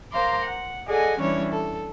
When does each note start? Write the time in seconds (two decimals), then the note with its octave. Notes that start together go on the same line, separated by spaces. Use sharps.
0.12 A#4 C5 F5 A#5 C6 D6
0.44 F#5
0.87 G#4 A4 D5 D#5 F#5 G#5
1.19 E3 G3 C#4 D4 E4 C#5
1.53 A4